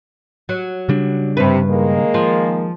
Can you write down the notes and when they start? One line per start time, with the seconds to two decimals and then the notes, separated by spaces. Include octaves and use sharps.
0.49 F#3
0.89 C#3 G3 D4
1.37 G2 C3 B4
1.70 D#3 G#3 A#3
2.14 F3